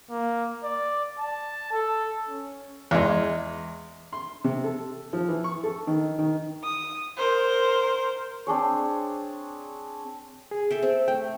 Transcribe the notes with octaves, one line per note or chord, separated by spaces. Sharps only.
A#3
D5
A5
A4
C#4
E2 G#3
C6
C3
A4
F3
E3
C#6
A4
D#3
D#3
D#6
A#4 C5
C4 D4 G#4 C#5
G#4
A4 E5 G5
C4
A3 G5